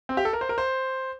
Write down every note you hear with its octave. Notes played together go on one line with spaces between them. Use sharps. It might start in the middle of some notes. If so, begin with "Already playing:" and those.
C4
G4
A4
A#4
C5
A#4
C5